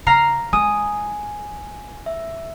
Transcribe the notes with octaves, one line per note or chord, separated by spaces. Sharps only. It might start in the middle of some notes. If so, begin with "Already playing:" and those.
C#3 F5 A#5 C7
G#3 G#5 D#6
E5